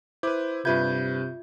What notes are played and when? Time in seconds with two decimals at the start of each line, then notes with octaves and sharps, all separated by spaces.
0.23 E4 B4 C5 D6
0.65 G2 C3 F4 B4 E5 G6 G#6